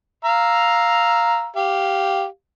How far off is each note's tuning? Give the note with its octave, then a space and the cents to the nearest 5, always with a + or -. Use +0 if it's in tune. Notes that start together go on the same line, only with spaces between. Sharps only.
F5 +0 A#5 +0 E6 +0
G4 -5 F5 +0